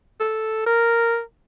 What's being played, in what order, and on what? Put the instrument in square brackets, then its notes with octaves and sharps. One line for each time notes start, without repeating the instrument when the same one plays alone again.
[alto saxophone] A4
A#4